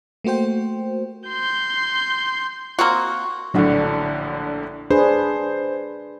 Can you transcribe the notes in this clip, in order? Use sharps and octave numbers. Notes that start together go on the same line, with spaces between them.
A3 A#3 F#4 C5 G5
C6 G6
A#3 C4 F#4
A#1 A2 D3 F#3 D4 F#5
D4 G#4 B4 C5